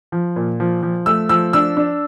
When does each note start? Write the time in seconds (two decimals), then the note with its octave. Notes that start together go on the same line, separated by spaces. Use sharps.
0.12 F3
0.36 A#2
0.60 F3
0.83 F3
1.06 A3 E6
1.29 F3 E6
1.53 D4 E6
1.77 D4